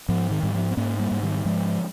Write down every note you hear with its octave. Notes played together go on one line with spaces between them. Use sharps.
G#2 F3
D#3
G#2 G3
F3
C4
G#2 A#3 C#4
G3 A#3
G#2
D#3 G3
G3
G#2 F3 G#3